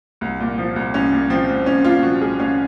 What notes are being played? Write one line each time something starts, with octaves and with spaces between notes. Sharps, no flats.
C2
A#2
F3
C2
C2 C#4
A#2
F3 C4
C2
C2 C#4
A#2 F4
F3 F#4
C2 G#4
C2 C#4